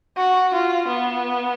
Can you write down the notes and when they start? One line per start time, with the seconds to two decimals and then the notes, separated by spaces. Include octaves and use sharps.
0.17 F#4
0.53 F4
0.88 B3